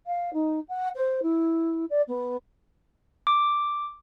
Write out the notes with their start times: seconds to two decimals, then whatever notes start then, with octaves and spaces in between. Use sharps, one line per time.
0.06 F5
0.33 D#4
0.68 F#5
0.95 C5
1.22 E4
1.90 D5
2.07 B3
3.27 D6